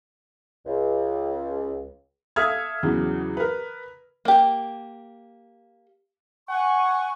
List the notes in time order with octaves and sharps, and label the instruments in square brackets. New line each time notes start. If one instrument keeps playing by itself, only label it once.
[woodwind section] C#2
[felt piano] A4 E5 F5 D#6 F6 G#6
E2 C#3 E3 F#3
A#4 B4
[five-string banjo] A#3 G4
[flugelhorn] F#5 [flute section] G#5 C#6